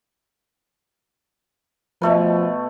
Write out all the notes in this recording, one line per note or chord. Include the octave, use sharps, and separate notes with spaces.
B2 F3 A3 B4